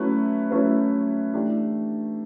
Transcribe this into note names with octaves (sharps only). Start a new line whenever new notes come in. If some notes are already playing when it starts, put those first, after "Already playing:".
Already playing: F#3 A3 C#4 E4 B4
F#3 A3 C#4 E4 B4
E3 A3 D4 G4